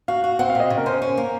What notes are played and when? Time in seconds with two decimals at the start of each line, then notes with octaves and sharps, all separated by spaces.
0.08 F#4 F5
0.24 F#4
0.39 C4 F#5
0.50 F5
0.55 A#2 D#5
0.70 C#3
0.77 A#4
0.86 C#4 C5
1.02 C#4
1.17 A#3